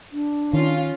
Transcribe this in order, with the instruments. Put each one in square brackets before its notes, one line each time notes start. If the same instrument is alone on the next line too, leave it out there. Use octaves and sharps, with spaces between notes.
[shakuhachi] D4
[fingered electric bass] D#3 [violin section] C#4 F4 F5